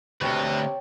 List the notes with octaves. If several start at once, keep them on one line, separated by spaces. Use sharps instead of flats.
D2 C3 F#4 B4 C#5 G5 A5